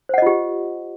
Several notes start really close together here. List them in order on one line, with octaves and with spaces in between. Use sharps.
C5 F#5 D#5 F4 G4